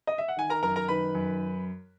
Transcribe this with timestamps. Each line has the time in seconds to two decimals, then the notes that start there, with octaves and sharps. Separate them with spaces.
0.07 D#5
0.18 E5
0.28 F#5
0.37 D#3 G#5
0.50 A#4 A#5
0.63 F#2 A#4 A#5
0.76 A#4 A#5
0.88 D#3 B4 B5
1.15 F#2